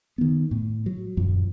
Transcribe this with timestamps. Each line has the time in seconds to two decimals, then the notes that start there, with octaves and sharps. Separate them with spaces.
0.18 D#3 B3
0.51 A2
0.86 F#3
1.17 D#1 F#2 F3